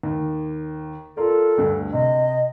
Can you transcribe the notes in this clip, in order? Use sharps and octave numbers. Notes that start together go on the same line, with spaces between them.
D#2
F4 A4 A#4 D5
D2 G2
C3 D#5